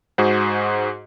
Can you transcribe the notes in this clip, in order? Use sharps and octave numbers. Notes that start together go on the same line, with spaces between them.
G#2 F#4 G#4 C5